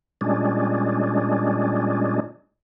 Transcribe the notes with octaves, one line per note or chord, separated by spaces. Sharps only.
A#2 G3 G#3 C#4 D4